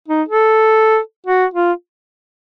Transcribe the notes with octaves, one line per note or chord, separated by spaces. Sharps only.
D#4
A4
F#4
F4